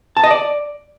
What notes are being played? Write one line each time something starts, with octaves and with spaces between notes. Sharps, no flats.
A5
D#5
D5